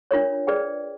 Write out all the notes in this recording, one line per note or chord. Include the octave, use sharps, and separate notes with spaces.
D4 F4 A#4 C#5
G#4 B4 D5 G5